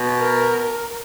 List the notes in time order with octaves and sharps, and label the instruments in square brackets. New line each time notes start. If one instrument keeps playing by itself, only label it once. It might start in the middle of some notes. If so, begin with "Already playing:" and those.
Already playing: [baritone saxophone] B2
[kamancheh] A#4